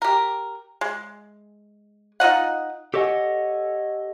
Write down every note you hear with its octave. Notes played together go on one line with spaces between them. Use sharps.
G4 A#4
G#3
D#4 F4 D#5 F#5
G4 A4 C#5 D#5 F#5 G#5